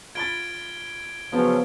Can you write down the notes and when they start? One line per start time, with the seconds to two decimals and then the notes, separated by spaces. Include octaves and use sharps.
0.15 F4 B5 G#6 A6 D7 G7
1.33 C#3 F3 F#3 B3 F4